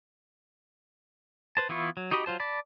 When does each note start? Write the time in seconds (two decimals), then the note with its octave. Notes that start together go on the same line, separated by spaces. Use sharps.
1.57 B4 C5 A5
1.69 E3 B3 E4 F4 C#6
1.97 F#3
2.11 D#4 F#4 G4 D#5 B5
2.26 F#3 F4 C5 A5
2.40 D5 A5 B5